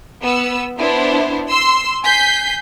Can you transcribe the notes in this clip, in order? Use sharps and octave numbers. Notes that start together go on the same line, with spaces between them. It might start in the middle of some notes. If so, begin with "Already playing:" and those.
B3 E6
B3 D4 E4 C5
C6 E6
G#5 G6 B6 C7